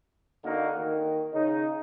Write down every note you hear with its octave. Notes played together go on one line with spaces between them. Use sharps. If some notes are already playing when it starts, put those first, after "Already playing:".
D3 A#3 D#4 F#4 A#4
D#3
C#3 D#4